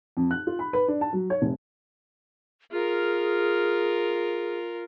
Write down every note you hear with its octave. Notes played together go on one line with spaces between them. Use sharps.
F2
F#6
F4
B5
B4
D4
A5
F#3
C#5
F1
F4 G#4 A#4